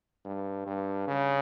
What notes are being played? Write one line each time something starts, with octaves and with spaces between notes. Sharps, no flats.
G2
G2
C#3